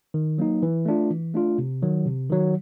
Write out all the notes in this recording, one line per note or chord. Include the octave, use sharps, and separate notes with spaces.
D#3
F#3 A#3 D#4
E3
A3 D4 F4
E3
A3 D4 F4
C3
D#3 F#3
C3
D#3 F#3